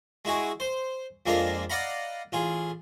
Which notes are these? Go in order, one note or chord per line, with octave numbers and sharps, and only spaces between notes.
G#3 E4 F#4 G#4
C5
F2 G#3 A#3 D4 F5 A#5
D5 D#5 F5 F#5 A#5 B5
A1 F4 G#4